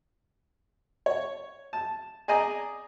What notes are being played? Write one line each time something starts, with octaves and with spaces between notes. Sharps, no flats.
C#5
A5
G#4 D5 D#5 G#5 A#5